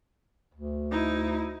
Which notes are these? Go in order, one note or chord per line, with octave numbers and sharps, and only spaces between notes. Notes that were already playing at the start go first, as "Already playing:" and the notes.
D2
D#4 E4